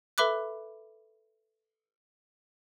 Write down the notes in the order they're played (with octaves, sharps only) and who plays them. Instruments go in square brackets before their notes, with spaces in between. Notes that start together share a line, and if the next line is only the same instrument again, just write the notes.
[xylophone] A4 B4 E5 B5 D6 F#6